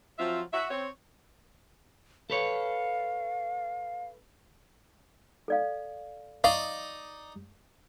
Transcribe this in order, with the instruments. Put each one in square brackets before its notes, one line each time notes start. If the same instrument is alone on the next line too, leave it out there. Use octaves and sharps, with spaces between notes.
[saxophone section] F3 F#3 C4 F4 E5
F#4 E5
C4 C#5
[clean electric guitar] A4 B4 C#5 [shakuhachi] F5
[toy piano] A4 D5 F5
[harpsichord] D#4 D5 [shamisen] F5 [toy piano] C#6 D#6